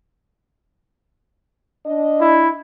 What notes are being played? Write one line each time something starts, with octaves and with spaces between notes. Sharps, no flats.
D4 D#5
E4